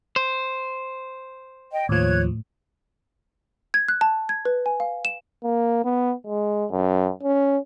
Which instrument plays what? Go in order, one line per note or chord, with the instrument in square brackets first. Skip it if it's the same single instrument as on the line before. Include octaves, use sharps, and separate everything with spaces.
[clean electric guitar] C5
[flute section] D#5 G5
[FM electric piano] D#2 F3 [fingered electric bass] A2 [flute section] C#5 F#6 G#6
[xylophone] G#6
F#6
A5
G#6
B4
G#5
F5
E7
[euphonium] A#3
B3
G#3
F#2
C#4